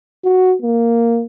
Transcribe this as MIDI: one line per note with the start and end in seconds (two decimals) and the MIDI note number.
0.25 0.55 66
0.62 1.24 58